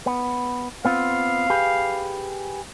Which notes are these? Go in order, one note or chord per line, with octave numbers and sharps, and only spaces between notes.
B3
B3 C4 F4 F5
G4 G#4 B4